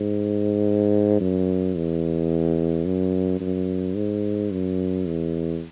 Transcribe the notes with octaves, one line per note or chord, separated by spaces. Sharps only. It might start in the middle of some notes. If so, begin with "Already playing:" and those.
Already playing: G#2
F#2
E2
F#2
F#2
G#2
F#2
E2